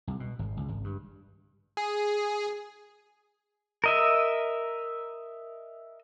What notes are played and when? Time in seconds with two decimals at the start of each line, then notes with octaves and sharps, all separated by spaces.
0.07 C2
0.20 B2
0.39 G#1
0.57 C#2
0.68 G#1
0.84 G2
1.77 G#4
3.84 A#4 D#5 E5